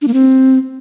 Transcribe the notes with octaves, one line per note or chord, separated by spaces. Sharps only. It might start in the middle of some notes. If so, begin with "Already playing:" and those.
D4
A#3
C4